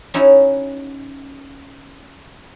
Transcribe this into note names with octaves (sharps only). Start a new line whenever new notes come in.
C#4 D#4 E4 F#4